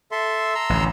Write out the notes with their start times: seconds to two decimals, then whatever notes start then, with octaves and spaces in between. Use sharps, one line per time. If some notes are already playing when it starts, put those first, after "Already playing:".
0.12 A4 E5 C6
0.55 A#5 C6 E6
0.70 A1 D2